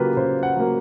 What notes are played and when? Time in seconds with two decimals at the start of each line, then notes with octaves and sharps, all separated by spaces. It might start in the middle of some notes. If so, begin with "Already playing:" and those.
Already playing: C#3 F#3 A#3 F4 G4 B4
0.17 C#3 C5
0.43 F#5
0.56 F#3 A#3